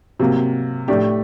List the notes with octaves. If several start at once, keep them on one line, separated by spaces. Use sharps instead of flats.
C3 F#3 A#3
A2 A3 D4 G4